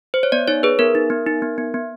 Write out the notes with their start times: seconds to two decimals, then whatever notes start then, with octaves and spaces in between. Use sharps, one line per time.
0.14 C5
0.23 C#5
0.32 B3 D5
0.48 D#4 C#5
0.63 G#4 B4
0.79 B3 A#4
0.95 D#4
1.10 B3
1.27 D#4
1.42 B3
1.58 B3
1.74 B3